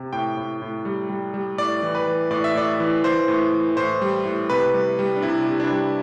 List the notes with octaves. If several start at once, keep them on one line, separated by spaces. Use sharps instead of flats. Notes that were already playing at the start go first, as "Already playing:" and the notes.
Already playing: C3
A2 G5
A2
A2
G3
G3
G3
A2 D5
E3
B4
E3
A2 D5
E5
A2 D5
E3
E3 C5
A2
E3
A2 C5
G3
A2
C3 B4
G3
G3
D4
C3 E4
C3
D4
G3